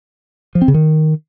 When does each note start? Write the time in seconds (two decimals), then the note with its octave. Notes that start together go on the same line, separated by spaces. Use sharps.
0.55 F3
0.62 C4
0.68 C#3
0.74 D#3